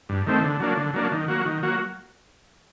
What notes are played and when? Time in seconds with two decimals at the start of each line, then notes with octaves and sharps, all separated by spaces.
0.09 G2
0.26 D#3 A3 C4
0.44 D3
0.60 F#3 A#3 D4
0.77 D3
0.94 F#3 A#3 D4
1.12 D#3
1.28 F#3 A#3 F#4
1.46 D#3
1.63 F#3 A#3 F#4